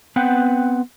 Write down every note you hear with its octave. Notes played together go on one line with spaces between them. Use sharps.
B3 C4 B4 F#5 G5